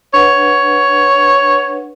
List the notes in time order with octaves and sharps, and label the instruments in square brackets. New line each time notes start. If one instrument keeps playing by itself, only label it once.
[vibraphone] D4 B4 F#5 [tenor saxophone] C#5